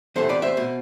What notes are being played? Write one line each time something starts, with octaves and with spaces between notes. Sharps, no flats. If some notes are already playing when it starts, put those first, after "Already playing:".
E2 C3 E3 A4 C5
B4 D5
C5 E5
B2